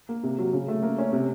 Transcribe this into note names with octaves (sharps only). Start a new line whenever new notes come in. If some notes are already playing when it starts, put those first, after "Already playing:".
A#3
C3
F#3
C#3
A3
A#3
C#4
C3